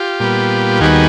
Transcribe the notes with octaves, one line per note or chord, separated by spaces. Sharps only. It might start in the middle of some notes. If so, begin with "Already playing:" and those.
Already playing: F4 G4
A#2 G3 B3
D#2 D#3 G3 B3 F#4 G#4